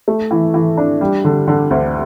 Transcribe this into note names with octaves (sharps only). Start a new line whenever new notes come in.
A3
E3
E3
D4
G3
D3
D3
D2